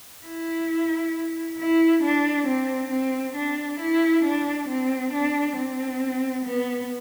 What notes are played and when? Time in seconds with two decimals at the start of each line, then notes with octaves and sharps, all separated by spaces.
0.25 E4
1.59 E4
2.03 D4
2.47 C4
2.91 C4
3.35 D4
3.80 E4
4.24 D4
4.69 C4
5.13 D4
5.56 C4
6.45 B3